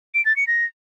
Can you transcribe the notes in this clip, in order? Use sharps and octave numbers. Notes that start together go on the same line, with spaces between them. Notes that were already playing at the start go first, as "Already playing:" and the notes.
D7
A6
C#7
A#6